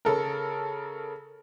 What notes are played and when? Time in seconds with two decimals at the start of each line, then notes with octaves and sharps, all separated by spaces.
0.05 C#3 A4 A#4